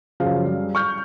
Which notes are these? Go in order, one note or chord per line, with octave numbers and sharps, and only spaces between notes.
F#2 C#3 F3 F5
G3
C#6 F6 G6